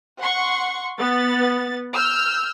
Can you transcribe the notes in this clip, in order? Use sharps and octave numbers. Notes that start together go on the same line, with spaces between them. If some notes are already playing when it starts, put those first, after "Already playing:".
F#5 C6 C#6
B3 A6
E6 F6 G6